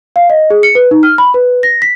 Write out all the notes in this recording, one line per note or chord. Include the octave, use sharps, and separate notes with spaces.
F5
D#5
G#4
C#7
B4
D#4
F6
B5
B4
A#6
B6